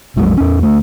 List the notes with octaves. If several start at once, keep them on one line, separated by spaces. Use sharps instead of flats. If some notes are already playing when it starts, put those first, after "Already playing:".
A#1 F2 F#3 G#3
E2 C#4
D2 A3